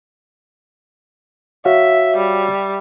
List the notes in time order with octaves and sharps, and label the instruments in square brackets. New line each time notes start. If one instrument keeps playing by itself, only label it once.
[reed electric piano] F#4 C#5 F5 [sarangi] E5
[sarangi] G3